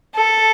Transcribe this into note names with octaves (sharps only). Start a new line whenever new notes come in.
A4